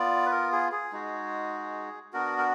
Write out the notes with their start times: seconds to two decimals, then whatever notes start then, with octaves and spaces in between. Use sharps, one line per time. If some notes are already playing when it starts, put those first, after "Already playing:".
Already playing: B3 F4 D5
0.26 B4
0.32 A#4
0.52 G#4
0.72 G#4
0.93 G#3 D#4 F#4
2.13 B3 D4 F#4 A#4
2.38 A#4